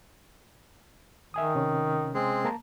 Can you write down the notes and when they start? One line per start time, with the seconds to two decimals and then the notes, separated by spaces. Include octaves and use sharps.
1.34 D#3 E5 G#5 D#6
1.55 C3 C#4
2.14 G#3 C4 G#4
2.45 A#3 A5 A#5